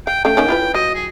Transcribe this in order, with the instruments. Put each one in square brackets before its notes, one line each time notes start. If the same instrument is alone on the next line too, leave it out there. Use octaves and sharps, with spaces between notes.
[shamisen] F5 [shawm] G5
[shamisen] A3 C#4 F5 [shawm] G5
[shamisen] D#3 A#3 C#4
E4 F4 B4
[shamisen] F#3 [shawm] D#5
[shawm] G#4